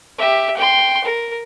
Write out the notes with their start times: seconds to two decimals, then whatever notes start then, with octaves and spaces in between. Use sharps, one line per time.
0.18 G4 E5
0.57 G5 C6
1.04 A#4